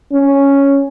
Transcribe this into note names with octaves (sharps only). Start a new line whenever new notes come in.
C#4